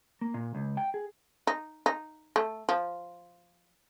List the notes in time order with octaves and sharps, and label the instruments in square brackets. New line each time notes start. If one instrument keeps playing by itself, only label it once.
[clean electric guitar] A#3
A#2
C#2
G5
G#4
[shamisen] D#4
D#4
A3
F3